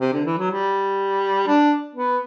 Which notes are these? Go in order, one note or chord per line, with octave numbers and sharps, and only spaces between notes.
C3
D3
E3
F#3
G3
D4
B3